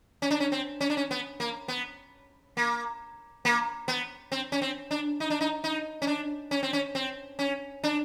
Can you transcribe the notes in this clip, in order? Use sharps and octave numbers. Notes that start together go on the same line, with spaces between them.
C#4
D4
C#4
C4
C#4
D4
C#4
B3
A#3
B3
A#3
A#3
B3
C4
C#4
C4
D4
D#4
D4
D#4
D#4
C#4
D4
C#4
C4
C#4
C4
C#4
D4